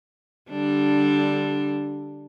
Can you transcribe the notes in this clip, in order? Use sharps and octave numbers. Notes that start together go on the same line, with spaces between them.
D3 G3 D4